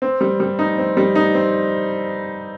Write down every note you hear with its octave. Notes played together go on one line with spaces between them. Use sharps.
C4
G3
G3
D#4
C4
G3
D#4
C4